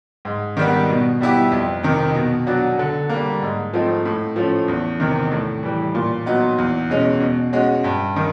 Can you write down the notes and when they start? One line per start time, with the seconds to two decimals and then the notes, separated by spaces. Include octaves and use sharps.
0.25 G#2
0.57 D#3 G3 B3
0.89 B2
1.21 G3 B3 E4 G4
1.52 F2
1.83 C3 D#3
2.15 B2
2.46 F#3 B3 D4 F#4
2.79 D3
3.09 G3 A#3
3.42 G#2
3.73 F3 A3 C4 D#4
4.05 A2
4.36 F3 A3 C#4
4.68 E2
5.00 C3 D#3
5.32 A2
5.63 E3 G3
5.95 A#2
6.26 F#3 B3 D#4
6.58 E2
6.90 B2 G#3 C#4
7.20 B2
7.53 G#3 C#4 F#4
7.84 G2
8.16 D#3